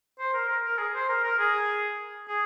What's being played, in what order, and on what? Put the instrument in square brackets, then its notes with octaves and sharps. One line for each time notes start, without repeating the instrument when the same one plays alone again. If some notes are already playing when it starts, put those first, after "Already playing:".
[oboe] C5
A#4
A#4
A#4
G#4
C5
A#4
A#4
G#4
G#4